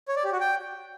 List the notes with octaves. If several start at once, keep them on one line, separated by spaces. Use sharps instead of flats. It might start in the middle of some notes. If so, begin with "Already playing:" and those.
C#5
D5
G4
F#4
G5